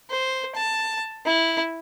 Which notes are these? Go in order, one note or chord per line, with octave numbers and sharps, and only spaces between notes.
C5
A5
E4